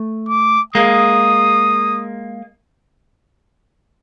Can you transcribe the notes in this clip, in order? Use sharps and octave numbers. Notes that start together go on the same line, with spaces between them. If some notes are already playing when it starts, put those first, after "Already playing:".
Already playing: A3
D6
G#3 A#3 D#6